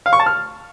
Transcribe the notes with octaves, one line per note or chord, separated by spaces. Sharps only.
F5
C#6
A5
F6